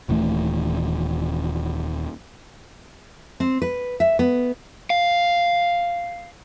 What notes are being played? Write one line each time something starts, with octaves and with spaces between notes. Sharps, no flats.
D#1 D#2 E3 A3
C4
B4
E5
B3
F5